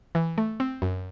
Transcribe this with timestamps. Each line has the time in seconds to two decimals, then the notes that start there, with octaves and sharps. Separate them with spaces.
0.15 E3
0.38 A3
0.60 C4
0.82 F#2